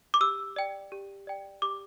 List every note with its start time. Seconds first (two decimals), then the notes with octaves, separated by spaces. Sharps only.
0.14 D6
0.21 G4 E6
0.56 D5 G5
0.92 G4
1.27 D5 G5
1.62 G4 D6